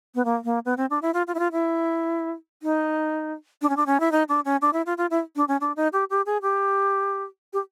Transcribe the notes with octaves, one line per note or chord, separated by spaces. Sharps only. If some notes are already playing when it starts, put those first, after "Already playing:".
B3
A#3
A#3
B3
C4
D4
E4
F4
F4
E4
F4
E4
D#4
D4
C#4
D4
C#4
E4
D#4
D4
C#4
D4
E4
F4
F4
E4
D4
C#4
D4
D#4
G4
G4
G#4
G4
G4